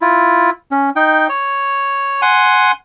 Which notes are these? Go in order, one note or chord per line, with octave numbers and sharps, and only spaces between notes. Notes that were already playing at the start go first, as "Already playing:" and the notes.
E4 F4
C#4
D#4 G5
C#5
F#5 G#5 C6